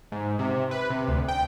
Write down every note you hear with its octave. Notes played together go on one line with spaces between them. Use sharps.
G#2
C3
B4
C3
D2
G5